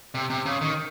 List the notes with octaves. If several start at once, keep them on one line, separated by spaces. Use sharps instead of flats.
C3
C3
C#3
D#3